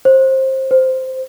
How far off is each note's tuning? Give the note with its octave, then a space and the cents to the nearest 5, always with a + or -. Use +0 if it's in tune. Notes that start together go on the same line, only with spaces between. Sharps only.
C5 +20
C5 -5